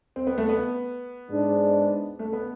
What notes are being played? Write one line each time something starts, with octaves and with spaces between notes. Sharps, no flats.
C4
B3
A3
B3
G#2 G#3 D4
A3
B3